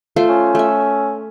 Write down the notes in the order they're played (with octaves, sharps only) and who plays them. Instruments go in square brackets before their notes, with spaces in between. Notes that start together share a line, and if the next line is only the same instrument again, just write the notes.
[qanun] A3 F4 C5
[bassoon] C#4
[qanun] A3 E5